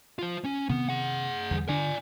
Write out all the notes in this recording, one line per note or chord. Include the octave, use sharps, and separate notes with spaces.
F4 C5
C#4
C3 D#3 B3
G#4 F#5
E2 D3 G3
D3 D4 D5 G#5